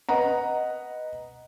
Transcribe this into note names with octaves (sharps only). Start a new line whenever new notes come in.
B4 D#5 F#5 A#5